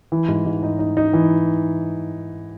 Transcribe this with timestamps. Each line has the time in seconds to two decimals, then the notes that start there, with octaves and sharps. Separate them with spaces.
0.12 E3
0.28 G#2
0.46 G#2
0.63 D#4
0.79 D#4
0.97 D#4
1.13 E3